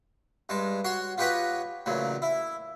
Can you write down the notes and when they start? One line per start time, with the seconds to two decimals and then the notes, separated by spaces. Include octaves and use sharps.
0.49 G2 G#3 A5
0.84 F#4 C#5 C6
1.18 F4 G4 B4 C#5 D#5 F#5
1.86 A1 A#2 C#3 F#3
2.22 E4